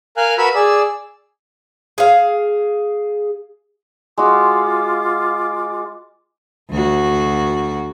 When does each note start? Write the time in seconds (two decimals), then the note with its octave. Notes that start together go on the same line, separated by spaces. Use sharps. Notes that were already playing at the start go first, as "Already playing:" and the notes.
0.17 A#4 F5 G#5 F#6
0.38 F#4 A#4 B4 B5 E6
0.55 G#4 D5 E6
1.98 G#4 F5
4.18 G#3 F4 F#4 D6
6.71 D2 F#4